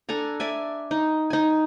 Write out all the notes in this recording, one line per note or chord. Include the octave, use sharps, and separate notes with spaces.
D4 A4 G#5 A#5
D5 E5 G#5
D#4
D#4 G#5